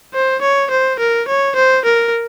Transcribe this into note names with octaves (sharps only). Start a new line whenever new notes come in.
C5
C#5
C5
A#4
C#5
C5
A#4